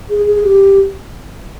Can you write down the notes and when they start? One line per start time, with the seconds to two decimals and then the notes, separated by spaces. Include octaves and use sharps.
0.10 G#4
0.27 G#4
0.44 G4